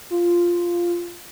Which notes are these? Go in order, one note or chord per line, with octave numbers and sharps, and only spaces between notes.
F4